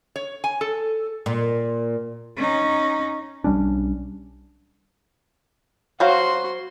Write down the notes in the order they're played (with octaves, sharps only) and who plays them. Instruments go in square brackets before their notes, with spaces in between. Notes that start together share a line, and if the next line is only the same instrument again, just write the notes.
[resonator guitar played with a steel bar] C#5
G#5
A4
[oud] A#2
[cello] C#4 D#4
[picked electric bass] B1 G3 C#4 D4
[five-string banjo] F#3 C5 F5 [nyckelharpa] F#4 C6